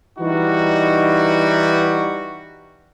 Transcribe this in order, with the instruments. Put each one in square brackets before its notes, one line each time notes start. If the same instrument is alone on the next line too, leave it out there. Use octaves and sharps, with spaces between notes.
[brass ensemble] E3 G3 D#4 F#4